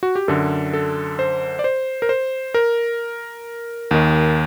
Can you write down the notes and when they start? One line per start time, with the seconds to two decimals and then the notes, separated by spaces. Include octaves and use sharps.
0.03 F#4
0.16 G4
0.28 F#2 D3 A4
0.73 A4
1.19 C5
1.59 D5
1.64 C5
2.02 A#4
2.09 C5
2.54 A#4
3.91 D#2 D#3